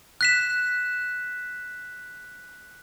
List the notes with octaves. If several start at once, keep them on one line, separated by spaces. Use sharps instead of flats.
F#6 B6 E7